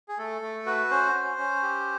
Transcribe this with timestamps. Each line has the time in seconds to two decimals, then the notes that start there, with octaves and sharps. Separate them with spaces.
0.09 G#4
0.18 A3 A4
0.42 A3
0.66 F#4 B4
0.91 C#4 C5
1.15 C#4
1.38 C#4
1.63 G4